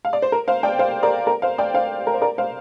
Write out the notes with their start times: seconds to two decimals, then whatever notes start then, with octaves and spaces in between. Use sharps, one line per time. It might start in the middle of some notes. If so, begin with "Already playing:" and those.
0.05 F5
0.13 D5
0.22 C5
0.32 A#4
0.48 C5 F5
0.63 D5 G5
0.79 C5 F5
1.03 A#4 D5
1.27 A#4
1.42 C5 F5
1.58 D5 G5
1.74 C5 F5
2.07 A#4
2.14 C5
2.22 A#4 D5
2.38 C5 F5